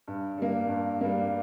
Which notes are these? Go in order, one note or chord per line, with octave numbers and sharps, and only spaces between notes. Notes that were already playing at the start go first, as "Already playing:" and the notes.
G2
G3 A#3
G2
G3 A#3